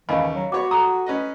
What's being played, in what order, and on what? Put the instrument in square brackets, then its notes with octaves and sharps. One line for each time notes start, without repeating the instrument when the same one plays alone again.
[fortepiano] D#2 C#3 [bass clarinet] E3 [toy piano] D#5 F5 B5
[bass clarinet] F#3
[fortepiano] B3 C#5 [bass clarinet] F#4 [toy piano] D6
[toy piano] A4 A#5 [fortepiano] D#6
[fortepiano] C#4 B4 D#5